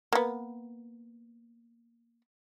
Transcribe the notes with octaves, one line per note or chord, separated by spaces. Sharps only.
A#3 B3